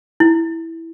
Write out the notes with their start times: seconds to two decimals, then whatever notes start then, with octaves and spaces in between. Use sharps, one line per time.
0.20 E4